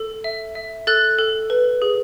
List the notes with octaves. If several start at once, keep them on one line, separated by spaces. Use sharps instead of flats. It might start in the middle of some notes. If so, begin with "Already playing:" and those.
Already playing: A4
E5
E5
A4 F#6 A6
A4
B4
G#4